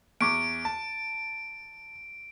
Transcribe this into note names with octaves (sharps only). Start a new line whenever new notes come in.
E2 C#6 D6 D7
A5